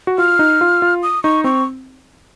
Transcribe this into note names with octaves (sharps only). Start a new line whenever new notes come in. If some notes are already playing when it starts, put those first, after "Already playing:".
F#4
F4 F6
D#4
F4
F4
D#6
D#4 C#6
C4 C#6